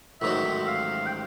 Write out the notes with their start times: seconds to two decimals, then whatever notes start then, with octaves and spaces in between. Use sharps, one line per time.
0.21 A1 G#2 D#3 F#3 E5
0.67 F5
1.06 G5